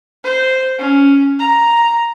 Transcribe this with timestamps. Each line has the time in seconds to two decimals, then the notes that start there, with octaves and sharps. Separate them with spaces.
0.24 C5
0.79 C#4
1.39 A#5